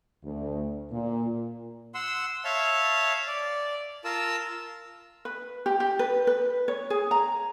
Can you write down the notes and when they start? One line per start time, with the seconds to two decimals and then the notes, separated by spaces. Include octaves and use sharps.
0.23 D2
0.91 A#2
1.95 F#5 C6 E6
2.45 C#5 E5 F5 A5
3.28 D5
4.05 F4 A#4 A5 E6
5.25 B4
5.66 G4
5.80 G4
5.99 B4
6.27 B4
6.68 C#5
6.90 G#4
7.11 A#5